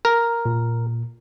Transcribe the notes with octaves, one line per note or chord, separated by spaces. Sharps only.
A#4
A#2